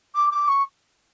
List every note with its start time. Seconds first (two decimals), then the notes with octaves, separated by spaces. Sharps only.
0.15 D6
0.31 D6
0.48 C#6